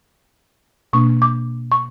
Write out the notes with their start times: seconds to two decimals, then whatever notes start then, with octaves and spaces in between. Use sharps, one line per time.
0.93 B2 A#3 D4 C#6
1.22 D6
1.72 C#6